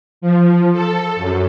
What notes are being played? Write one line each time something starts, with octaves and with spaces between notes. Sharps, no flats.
F3
A4
F#2